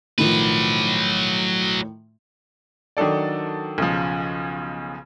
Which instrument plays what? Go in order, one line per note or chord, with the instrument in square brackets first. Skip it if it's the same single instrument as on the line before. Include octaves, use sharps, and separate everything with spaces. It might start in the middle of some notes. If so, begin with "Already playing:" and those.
[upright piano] A2 D#3 F3 [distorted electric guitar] F#3 B4
[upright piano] D#3 F#3 D4 A4 D5
B1 C#3 F3